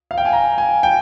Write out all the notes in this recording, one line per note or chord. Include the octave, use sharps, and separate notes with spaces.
F5
G5
G#5
A#5
G#5
G5